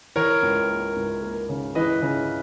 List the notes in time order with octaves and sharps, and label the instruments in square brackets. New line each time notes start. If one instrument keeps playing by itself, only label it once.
[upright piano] E3 [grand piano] A#4 C#5
[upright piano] C#2
A#3
C#2
A#3
C#3
[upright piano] E3 [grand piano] B4 D#5
[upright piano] C#3